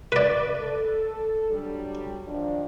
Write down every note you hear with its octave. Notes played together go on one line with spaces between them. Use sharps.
B4 D5
A4
F#3 G3 D4
D#3 F3 D4